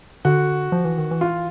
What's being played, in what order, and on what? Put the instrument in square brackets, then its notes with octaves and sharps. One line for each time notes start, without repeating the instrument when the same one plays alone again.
[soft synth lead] D3 [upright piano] F#4
[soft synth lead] F3
E3
D#3
E3
[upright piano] F4